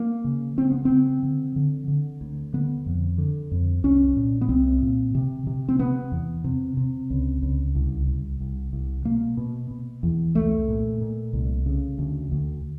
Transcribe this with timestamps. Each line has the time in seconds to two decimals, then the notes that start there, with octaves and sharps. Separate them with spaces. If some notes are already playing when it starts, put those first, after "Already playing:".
Already playing: A#3
0.24 C#3
0.57 C#3 C4
0.72 B3
0.85 C#3 C4
1.23 D3
1.56 D3
1.88 D3
2.21 D2
2.53 D3 B3
2.86 F2
3.18 D3
3.51 F2
3.84 C2 C#4
4.16 A#2
4.41 B3
4.49 C2 C4
4.82 A#2
5.15 C3
5.47 C3
5.69 C4
5.79 C3 B3
6.12 E2
6.44 C3
6.77 C3
7.10 C#2
7.42 C#2
7.75 C2
8.07 C2
8.40 C2
8.73 C2
9.05 B2 A#3
9.37 B2
9.71 B2
10.03 E2
10.35 C2 A3
10.68 A#2
11.01 A#2
11.33 C2
11.66 C#3
11.99 D2
12.32 D2